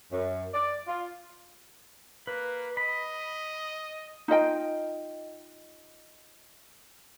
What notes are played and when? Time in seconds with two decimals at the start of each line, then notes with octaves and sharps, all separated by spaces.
0.12 F#2
0.54 D5
0.87 F4
2.27 A#3 B4
2.77 D#5 B5
4.28 D#4 F4 D#5 G5